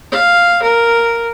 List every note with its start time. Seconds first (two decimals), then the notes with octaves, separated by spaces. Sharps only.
0.12 F5
0.63 A#4